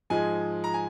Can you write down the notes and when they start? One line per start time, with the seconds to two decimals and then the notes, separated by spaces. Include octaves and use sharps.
0.10 G#2 F3 G#3 G#5
0.64 A#5
0.74 G#5